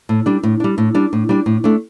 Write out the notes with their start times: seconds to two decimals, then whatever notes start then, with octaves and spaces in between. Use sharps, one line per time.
0.09 A2
0.26 G3 D4
0.43 A2
0.60 G3 D4
0.78 A2
0.94 G3 D4
1.13 A2
1.29 G3 D4
1.46 A2
1.64 A3 D4